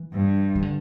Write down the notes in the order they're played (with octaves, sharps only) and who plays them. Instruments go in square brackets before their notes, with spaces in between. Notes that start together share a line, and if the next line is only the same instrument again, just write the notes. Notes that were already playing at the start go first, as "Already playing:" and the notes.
Already playing: [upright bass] E3
[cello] G2
[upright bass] D#3
D3